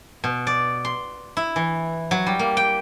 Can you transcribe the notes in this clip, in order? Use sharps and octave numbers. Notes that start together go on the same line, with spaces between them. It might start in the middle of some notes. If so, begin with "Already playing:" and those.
B2
D5
C6
E4
E3
F#3
G3
A#3
G5